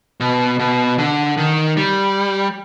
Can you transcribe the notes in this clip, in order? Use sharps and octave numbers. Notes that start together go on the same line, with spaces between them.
B2
B2
D3
D#3
G3